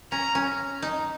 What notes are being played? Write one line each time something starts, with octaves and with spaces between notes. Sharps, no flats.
C#4 A#5
C#4
D#4